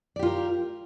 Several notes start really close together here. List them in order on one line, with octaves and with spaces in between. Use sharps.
D5 G4 F4 A#4